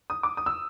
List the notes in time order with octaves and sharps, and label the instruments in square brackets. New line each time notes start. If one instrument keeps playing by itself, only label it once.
[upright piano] D#6
D6
D#6
E6